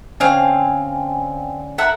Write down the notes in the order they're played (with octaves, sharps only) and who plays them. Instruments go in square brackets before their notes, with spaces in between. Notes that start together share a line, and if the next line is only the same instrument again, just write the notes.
[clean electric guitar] D3 C#4 [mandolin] C4 F5 G#5
[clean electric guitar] A4 A#4 [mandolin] E5 F#5 E6